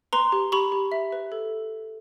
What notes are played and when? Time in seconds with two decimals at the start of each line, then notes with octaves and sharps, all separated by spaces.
0.13 B4 A#5 C6
0.32 G4
0.52 G4 B5 C#6
0.72 G4
0.92 E5
1.12 B4
1.32 A4